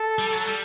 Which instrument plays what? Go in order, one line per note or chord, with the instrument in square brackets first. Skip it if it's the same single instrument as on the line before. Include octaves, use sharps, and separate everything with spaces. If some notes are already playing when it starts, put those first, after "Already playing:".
Already playing: [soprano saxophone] A4
[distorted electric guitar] G3
F#3
G3